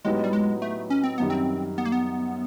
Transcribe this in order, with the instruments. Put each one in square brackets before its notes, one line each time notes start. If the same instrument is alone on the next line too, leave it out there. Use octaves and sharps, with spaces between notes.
[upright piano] A2 F#3 B3 D#4 G4 [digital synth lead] G#3
[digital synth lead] G3
G#3
A3
C#4
C4
[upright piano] F#2 D#3 G3 [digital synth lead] B3
[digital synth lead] C4
B3
A#3
B3